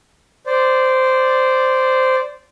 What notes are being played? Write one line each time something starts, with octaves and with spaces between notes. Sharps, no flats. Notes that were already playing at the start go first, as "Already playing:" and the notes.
C5 D5